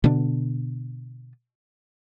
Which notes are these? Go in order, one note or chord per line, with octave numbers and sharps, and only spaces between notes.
B2 D3 B3 D4